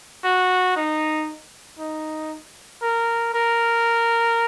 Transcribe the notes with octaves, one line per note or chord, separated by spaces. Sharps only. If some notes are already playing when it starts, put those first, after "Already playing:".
F#4
D#4
D#4
A#4
A#4